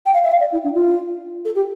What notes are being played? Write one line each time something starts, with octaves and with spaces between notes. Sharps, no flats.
G5
F5
E5
F5
D5
E4
D4
F4
A4
G4